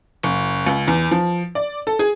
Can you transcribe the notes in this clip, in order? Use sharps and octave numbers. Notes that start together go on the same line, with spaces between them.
F#1
C#2
E2
F3
D5
A4
G#4